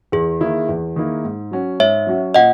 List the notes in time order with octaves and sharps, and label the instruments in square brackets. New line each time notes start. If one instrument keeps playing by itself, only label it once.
[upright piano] E2 [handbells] G#4
[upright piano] D#3 A#3 E4
E2
D#3 A#3 E4
G#2
F#3 C#4 F#4
[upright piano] G#2 [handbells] C#5 E5
[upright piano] F#3 C#4 F#4
[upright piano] A#2 [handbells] D#5 F#5